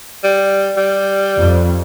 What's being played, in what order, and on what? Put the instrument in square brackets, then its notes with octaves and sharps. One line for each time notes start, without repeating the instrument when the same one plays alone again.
[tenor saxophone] G3
G3
[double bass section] F2